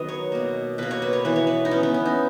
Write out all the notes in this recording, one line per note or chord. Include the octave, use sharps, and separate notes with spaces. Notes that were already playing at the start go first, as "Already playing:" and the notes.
Already playing: D#3 F#3 B3 B4 D#5
C#5
B2 A#3
B2 A#3 B4
C#5
B4
C#5
E3 B3 B4
C#5
B4
D#4
E3 B3 C#4
B3
C#4
D#4